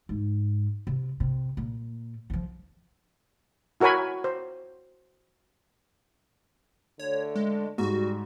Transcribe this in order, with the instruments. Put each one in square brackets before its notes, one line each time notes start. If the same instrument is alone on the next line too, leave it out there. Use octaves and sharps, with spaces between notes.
[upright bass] G#2
C3
C3
A#2
E3 F3
[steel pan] E4 F#4 A#4 C#5 G#5 B5
C5
[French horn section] D2 D3 A3 [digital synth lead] C#5
[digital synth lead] G#3
[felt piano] G#2 [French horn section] G3 [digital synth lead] F#4